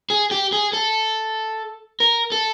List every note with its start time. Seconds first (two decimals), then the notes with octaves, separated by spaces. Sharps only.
0.10 G#4
0.31 G4
0.52 G#4
0.73 A4
2.00 A#4
2.32 A4